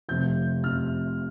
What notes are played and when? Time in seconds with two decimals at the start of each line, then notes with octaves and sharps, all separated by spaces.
0.09 F1 F2 C3 F3 G6
0.64 F1 F2 C3 F3 F6